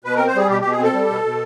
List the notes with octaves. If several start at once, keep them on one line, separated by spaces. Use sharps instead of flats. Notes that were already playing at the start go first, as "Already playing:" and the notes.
B2 B4
C4 A#4
C5
G3 G#4
B2 G4
B2 G4
G#4
C4 A4
G3
B2
B2